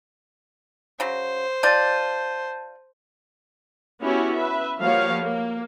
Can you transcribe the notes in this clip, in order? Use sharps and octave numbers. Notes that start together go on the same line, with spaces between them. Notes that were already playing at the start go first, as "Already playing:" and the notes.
C#3 F#3 C5
F4 D5 A5 G6
B3 C#4 E4 F#4 G4 C#5
B4 E5
F3 G3 A#3 F#4 C#5 F5
A#3